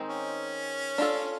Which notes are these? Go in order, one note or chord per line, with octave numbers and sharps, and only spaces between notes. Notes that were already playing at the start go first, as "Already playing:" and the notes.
Already playing: D#3 G#3 C4 D#4
C#4
D4 F4 A4